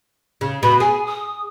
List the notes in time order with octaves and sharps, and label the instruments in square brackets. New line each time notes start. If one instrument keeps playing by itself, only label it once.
[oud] C#3
[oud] B2 [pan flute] B5
[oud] G#4 [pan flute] G#5
[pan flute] D#6